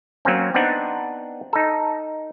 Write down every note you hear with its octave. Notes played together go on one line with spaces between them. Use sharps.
F#3 A#3 C4 C#4
B3 C4 D4 D#4 F#5
D#4 A4